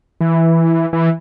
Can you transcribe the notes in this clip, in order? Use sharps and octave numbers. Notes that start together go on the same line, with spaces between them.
E3
E3